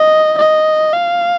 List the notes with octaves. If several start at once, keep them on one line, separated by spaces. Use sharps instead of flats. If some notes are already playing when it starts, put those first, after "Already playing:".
Already playing: D#5
D#5
F5